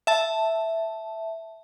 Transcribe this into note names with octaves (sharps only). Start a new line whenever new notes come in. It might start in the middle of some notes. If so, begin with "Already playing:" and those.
E5 A5